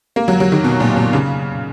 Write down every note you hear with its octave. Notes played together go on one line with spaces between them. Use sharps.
A#3
F#3
F#3
D#3
B2
A#2
A#2
C#3